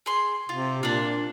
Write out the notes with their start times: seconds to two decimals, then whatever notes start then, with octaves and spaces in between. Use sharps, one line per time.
0.06 G#4 C6
0.49 C3 F4
0.83 A#2 D4 F4